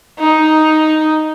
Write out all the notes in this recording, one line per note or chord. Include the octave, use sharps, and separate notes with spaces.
D#4